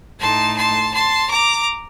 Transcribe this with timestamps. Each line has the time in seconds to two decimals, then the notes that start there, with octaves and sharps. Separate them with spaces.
0.19 A2 A3 D#4 A5 C6
0.56 A5 C6
0.93 A5 C6
1.30 A#5 D6